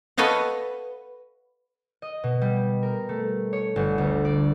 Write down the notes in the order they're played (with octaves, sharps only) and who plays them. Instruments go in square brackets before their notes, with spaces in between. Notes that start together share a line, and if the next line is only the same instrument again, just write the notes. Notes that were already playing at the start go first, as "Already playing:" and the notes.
[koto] A4 B4 C#5 D#5 F5 F#5
[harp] D#5
B2
G3
A#4
A3
C#5
G1
D2
D5